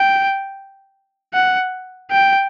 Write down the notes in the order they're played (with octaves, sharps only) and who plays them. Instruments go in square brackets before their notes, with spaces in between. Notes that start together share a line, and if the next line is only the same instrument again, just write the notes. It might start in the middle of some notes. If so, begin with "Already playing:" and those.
Already playing: [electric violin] G5
F#5
G5